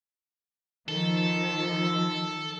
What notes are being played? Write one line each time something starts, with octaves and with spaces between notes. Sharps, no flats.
D#3 F3 A4